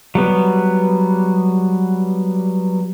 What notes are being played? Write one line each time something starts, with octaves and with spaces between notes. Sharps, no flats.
F#3 G3 B3